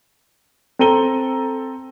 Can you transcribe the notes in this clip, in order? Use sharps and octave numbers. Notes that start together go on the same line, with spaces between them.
C4 A4 A#5 D#7 G7